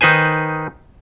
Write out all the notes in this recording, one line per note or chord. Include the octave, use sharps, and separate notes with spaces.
D#3 D#4 B4 C5 G#5